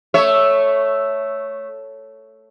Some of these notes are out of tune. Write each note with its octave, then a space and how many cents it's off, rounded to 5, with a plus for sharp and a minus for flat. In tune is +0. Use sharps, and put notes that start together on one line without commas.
A3 +0 C#5 +0 E5 +0